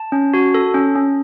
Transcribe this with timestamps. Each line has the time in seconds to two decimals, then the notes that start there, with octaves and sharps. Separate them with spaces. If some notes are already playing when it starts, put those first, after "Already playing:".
Already playing: A5
0.12 C#4
0.34 F#4
0.54 A4
0.74 C#4
0.96 C#4